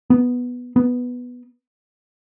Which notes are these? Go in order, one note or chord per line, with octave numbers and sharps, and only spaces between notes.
B3
B3